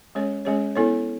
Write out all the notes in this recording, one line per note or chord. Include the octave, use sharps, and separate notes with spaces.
G#3 C#4 G#4 C#5
G#3 C#4 G#4 C#5
B3 E4 A4 C#5